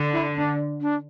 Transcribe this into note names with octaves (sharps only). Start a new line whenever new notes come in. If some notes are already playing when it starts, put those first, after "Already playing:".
Already playing: D3
E4
D4
D4